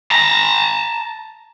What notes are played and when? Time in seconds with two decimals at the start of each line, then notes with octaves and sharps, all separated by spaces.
0.11 A5 A#5